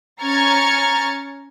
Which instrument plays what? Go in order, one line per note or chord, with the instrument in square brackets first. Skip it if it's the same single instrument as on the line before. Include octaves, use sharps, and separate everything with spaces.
[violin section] C#4 A#5 F6 G#6 A6 C#7